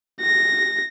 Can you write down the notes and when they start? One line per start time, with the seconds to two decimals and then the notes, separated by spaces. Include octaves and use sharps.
0.21 A#6